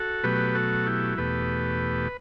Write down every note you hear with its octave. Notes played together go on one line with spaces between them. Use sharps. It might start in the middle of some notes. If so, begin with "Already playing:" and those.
Already playing: F#4 A4
B2 F#3 A3 G4 B4
F#4 A4
E4 G4
E2 B2 A3 G4 B4